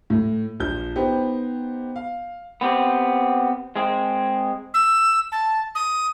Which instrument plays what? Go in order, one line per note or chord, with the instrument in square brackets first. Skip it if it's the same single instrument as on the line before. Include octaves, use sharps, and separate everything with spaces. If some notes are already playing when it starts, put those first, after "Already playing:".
[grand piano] A2
A#1 F3 G6
B3 D#4 G4 C5
F5
[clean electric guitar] B3 C4 G4
G#3 C4 G#4
[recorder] E6
A5
D#6